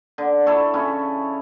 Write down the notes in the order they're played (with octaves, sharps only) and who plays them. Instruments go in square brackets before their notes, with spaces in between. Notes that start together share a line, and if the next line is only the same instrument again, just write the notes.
[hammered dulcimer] D3
E4 A4 C#5
C#3 C#4 E4